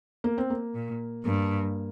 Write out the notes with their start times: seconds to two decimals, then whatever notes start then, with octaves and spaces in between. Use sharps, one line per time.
0.24 A#3
0.38 C4
0.50 A#3
0.75 A#2
1.25 G2 A#3